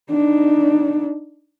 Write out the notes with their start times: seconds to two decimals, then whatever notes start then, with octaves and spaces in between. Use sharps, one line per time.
0.10 D4 D#4